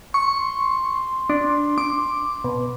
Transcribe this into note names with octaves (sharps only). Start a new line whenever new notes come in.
C6 C#6
D4
D6
B2